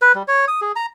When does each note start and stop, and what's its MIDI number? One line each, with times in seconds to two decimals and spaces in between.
0.02 0.12 71
0.15 0.23 55
0.28 0.45 73
0.48 0.61 87
0.62 0.72 68
0.76 0.86 82